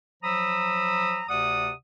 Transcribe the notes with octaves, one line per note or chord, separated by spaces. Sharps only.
F3 F#3 A#5 B5 D#6 E6
D2 C3 D5 F#5 D#6